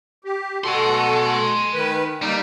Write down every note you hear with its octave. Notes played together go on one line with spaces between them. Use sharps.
G4
B2 F#4 A4 G#5 C6
D#3 B4
G3 A#3 D#4